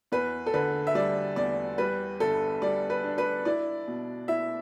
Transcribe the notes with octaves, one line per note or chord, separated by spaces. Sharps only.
E2 B4
A4
D3 B4
E5
G3 D5
E2 D5
G3 B4
G1 A4
G3 D5
B4
D4
B4
E4 D5
B2
E4 E5